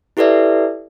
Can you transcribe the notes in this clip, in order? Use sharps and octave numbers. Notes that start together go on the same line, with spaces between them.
E4 G4 A4 B4 D5 E5